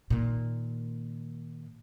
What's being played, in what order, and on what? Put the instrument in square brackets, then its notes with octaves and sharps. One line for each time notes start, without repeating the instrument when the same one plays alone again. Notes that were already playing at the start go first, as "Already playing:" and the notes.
[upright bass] A#2 D#3